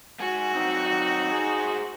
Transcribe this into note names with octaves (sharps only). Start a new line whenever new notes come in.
G#2 F#4 G#5
F#3 C4 D#4
G#4 C5